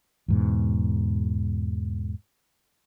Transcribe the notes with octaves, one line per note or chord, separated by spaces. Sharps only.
E2 G#2 B2